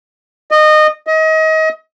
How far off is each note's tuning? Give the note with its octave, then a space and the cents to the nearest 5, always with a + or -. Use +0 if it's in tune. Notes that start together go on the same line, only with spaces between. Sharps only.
D#5 -20
D#5 +30